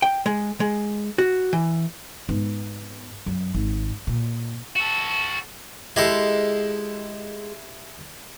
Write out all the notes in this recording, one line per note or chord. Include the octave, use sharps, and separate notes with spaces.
G5
G#3
G#3
F#4
E3
G#2 B3
F#2
G#1
A#2
F#4 A4
G#3 E4 G4 A4